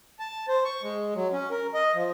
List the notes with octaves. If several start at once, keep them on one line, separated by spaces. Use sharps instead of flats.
A5
C5
C#6
G#3
F#3
C#4
A#4
D#5
F3